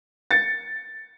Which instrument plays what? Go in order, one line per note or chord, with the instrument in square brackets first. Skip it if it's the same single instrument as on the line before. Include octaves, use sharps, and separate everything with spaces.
[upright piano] A6 C#7